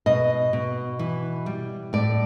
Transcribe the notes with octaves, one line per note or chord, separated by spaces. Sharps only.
B2 D#5
B2
E3
G3
A2 D5